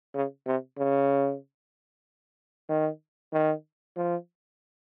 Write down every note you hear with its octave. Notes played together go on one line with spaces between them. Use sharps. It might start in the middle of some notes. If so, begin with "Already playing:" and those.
C#3
C3
C#3
D#3
D#3
F3